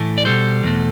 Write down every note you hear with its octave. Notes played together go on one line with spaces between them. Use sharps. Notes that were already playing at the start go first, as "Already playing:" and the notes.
Already playing: A2 E3 A3
D5
B2 G3 A4 C5
E2 B2 A3